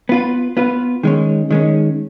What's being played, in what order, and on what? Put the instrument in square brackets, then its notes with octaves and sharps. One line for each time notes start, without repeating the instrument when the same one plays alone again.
[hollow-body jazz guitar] B3 F4 B4
B3 F4 B4
D#3 G#3 C#4
D#3 G#3 C#4